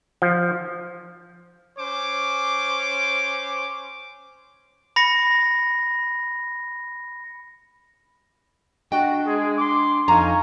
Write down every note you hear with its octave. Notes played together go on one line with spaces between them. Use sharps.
F3
C#4 C5 D6
B5 A#6 C#7
D4 F#4 D#5 G5
G#3 G#4
C6 D6
F2 D#4 F5 G#5 A#5 C#6